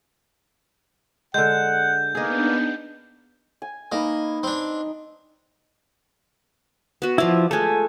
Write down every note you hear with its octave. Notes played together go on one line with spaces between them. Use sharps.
D3 G#3 F#5 G6
A#3 B3 D4 D#4 G#4 D#5
G#5
A#3 D#4 B4 D#5
C4 D4
B3 F#4
F3 E4 F4 D5
G#3 A3 A4 G#5